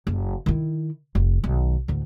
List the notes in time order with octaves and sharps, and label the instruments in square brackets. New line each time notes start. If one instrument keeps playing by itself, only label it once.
[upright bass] F#1
D#3 E4
F1
B1 D#3
D2 A2